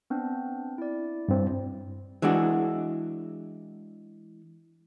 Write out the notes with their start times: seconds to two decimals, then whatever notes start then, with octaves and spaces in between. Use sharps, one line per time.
0.10 B3 C4 D4
0.78 E4 D5
1.28 G2 C4
2.22 E3 G#3 D4 F#4